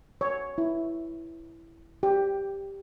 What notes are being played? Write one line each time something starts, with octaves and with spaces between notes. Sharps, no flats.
C#5
E4
G4